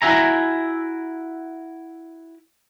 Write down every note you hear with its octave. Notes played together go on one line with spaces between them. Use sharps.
E4 F#4 E5 G#5 A#5